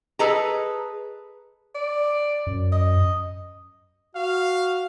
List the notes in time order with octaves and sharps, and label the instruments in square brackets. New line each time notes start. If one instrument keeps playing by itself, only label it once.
[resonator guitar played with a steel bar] G#4 A4 B4 D#5 A5 A#5
[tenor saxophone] D5
[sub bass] F#2
[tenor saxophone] D#5
[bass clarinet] F#4 [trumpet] F5